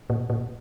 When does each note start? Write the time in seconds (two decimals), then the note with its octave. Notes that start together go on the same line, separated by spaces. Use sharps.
0.10 A#2
0.30 A#2